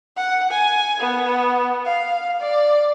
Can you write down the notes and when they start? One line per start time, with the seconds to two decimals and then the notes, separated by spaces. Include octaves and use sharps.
0.17 F#5
0.51 G#5
1.00 B3
1.86 F5
2.41 D5